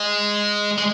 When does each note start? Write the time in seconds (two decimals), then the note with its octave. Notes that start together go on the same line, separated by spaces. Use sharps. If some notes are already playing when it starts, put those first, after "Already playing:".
Already playing: G#3
0.78 G#3